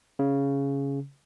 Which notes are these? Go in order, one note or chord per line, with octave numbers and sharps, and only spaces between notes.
C#3